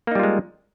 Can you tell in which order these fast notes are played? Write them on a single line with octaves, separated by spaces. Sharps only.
A#3 D#4 G3 F4 G#3